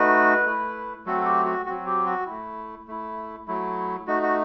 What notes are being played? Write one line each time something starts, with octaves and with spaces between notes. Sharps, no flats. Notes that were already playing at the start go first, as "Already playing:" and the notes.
Already playing: A3 D#4 F#4 B4
A3 E4
F#3 A3 C4 F#4 A4
A4
G4
F#4
F#3 C4 F#4
G4
F#4
A3 E4
A3 E4
F#3 A3 E4
A3 D#4 F#4
F#4